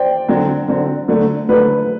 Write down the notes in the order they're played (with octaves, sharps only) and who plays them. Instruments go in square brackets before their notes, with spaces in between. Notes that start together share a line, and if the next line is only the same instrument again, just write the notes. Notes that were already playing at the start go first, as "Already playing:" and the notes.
Already playing: [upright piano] C5 D5 G5
[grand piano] D3 F#3 C4
D3 F#3 C4
D3 F#3 A3
[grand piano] D3 F#3 A3 [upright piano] B4